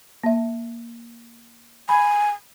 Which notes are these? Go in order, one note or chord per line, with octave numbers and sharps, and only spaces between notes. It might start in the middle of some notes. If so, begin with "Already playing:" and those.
A#3 E5
G#5 B5